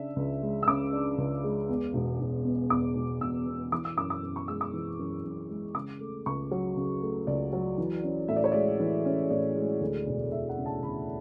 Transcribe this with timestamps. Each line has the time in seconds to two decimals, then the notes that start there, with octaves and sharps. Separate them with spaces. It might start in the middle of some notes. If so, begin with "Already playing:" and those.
Already playing: C#3 D4 E5
0.16 C#2
0.42 G#3
0.63 E6
0.68 C#3 D6
0.93 D4
1.18 C#2
1.44 G#3
1.69 E2
1.94 E1
2.20 E1
2.45 B2
2.70 E2 D6
2.96 E1
3.21 E1 E6
3.46 B2
3.72 E3 D6
3.85 E6
3.97 F#2 D6
4.10 D6
4.23 F#2
4.36 C#6
4.48 G#3 E6
4.61 D6
4.73 E3
4.99 F#2
5.24 F#2
5.49 G#3
5.75 C#3 D6
6.00 A3
6.26 C#2 C#6
6.51 F#3
6.76 C#3
7.02 A3
7.27 C#2 D5
7.53 F#3
7.78 E3
8.04 C#4
8.28 A2 E5
8.36 D5
8.44 C#5
8.52 G#3 D5
8.80 E3
9.05 C#4
9.30 A2 D5
9.56 G#3
9.81 D2
10.07 E1
10.32 E1 E5
10.49 F#5
10.58 C#3
10.66 A5
10.83 D2 B5